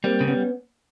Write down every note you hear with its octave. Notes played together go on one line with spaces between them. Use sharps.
G3 A#3 C4
C#3
B3 C#4